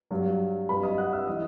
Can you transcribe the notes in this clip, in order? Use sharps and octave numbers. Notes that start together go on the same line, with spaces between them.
G2 F#3
G2 F#3 B4 B5
D#5 D#6
F#5 F#6
E5 E6
E3 D#5 D#6